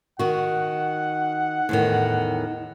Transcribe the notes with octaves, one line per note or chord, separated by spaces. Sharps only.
D#3 F#4 F#5
E2 A2 D#3